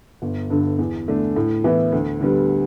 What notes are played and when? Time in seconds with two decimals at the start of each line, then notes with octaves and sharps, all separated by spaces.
0.22 G1
0.50 G2 D3
0.79 E2
1.08 D3 A3 D4
1.36 A2
1.64 E3 B3 E4
1.92 D2
2.21 D3 G3 B3